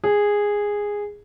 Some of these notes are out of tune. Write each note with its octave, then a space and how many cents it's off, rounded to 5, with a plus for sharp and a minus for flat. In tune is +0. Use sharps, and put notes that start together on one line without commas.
G#4 -10